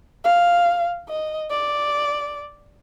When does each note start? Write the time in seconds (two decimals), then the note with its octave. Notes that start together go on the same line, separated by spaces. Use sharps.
0.25 F5
1.08 D#5
1.51 D5